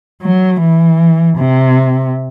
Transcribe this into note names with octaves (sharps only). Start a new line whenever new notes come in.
F#3
E3
C3